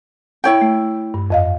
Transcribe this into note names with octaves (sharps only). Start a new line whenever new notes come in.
E4 C#5 G5
A3
G2
F2 D#5 F5